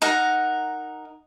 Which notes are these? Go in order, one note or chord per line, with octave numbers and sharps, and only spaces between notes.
D#4 A#4 F#5